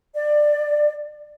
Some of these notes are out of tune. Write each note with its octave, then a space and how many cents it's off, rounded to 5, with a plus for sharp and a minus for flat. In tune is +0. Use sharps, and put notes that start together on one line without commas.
D5 +15